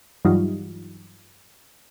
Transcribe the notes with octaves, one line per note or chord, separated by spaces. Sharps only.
G2 E3 F#3 G3 D#4 F4